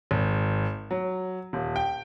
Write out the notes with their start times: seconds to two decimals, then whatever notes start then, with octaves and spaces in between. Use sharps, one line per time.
0.11 G#1
0.91 F#3
1.53 D#1
1.76 G5